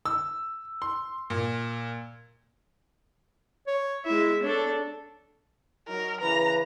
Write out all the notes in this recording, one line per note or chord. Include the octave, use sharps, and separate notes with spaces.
E6
C6
A#2
C#5
G#3 E4 E5
D4 A4 C#5
F#3 D#4 A#4
C#3 E3 B4 A#5